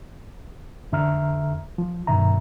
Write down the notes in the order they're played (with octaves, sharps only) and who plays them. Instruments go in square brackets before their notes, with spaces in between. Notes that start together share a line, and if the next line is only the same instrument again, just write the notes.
[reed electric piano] F2 D3 E5 A#5 F6
F3
G2 B2 D#3 E5 A#5